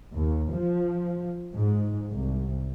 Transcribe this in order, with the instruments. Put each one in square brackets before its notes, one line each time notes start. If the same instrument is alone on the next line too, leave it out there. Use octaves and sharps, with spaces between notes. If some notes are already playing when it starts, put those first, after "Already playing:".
[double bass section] D#2
F3
G#2
C2